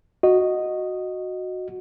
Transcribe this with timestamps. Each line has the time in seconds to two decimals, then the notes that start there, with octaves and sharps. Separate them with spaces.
0.23 F#4 D#5